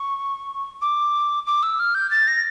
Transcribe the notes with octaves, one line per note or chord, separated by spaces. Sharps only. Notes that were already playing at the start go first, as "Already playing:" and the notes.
Already playing: C#6
D6
D6
E6
F6
G6
A6
A#6